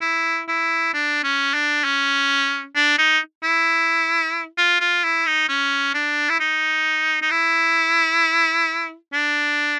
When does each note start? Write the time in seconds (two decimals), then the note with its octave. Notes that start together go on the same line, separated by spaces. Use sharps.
0.02 E4
0.48 E4
0.94 D4
1.24 C#4
1.54 D4
1.85 C#4
2.76 D4
2.98 D#4
3.43 E4
4.58 F4
4.81 F4
5.04 E4
5.26 D#4
5.49 C#4
5.95 D4
6.30 E4
6.40 D#4
7.22 D#4
7.31 E4
9.13 D4